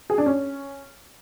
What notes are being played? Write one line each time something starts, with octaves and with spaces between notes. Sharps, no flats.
G#4
D4
C#4